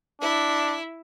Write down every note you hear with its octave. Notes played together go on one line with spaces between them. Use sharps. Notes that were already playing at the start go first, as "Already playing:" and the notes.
D4 E4